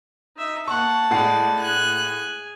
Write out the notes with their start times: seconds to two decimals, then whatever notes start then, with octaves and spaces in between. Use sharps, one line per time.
0.37 D#4 E5
0.68 A#3 F#5 A5 C#6
1.11 A2 G#3 D5 F#5 C7
1.60 G#4 G#5 F#6